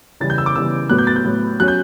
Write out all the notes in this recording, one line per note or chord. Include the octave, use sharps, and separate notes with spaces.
C#3 E3 G3 A6
G6
E6
D6
C#3 E3 G3 E6
A2 F#3 B3 F#6
G6
A6
G6
A2 F#3 B3
F#3 C#4 F#6
G6